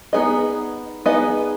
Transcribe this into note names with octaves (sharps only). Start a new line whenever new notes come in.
B3 D#4 G#4 B4 D#5
B3 D#4 G#4 B4 D#5